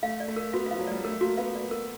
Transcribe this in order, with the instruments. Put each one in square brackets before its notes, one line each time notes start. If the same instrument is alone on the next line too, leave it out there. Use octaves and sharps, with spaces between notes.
[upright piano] A3 [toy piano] F5
[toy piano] D5
[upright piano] A3
[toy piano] A#4
[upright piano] B3 [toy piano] F#4
[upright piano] B3
[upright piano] F3 [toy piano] F5
[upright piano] F#3
[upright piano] G3 [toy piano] D5
[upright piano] A3 [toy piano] A#4
[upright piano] A#3 [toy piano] F#4
[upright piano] B3 [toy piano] F5
[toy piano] D5
A#4